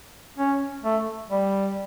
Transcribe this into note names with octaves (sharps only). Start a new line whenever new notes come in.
C#4
A3
G3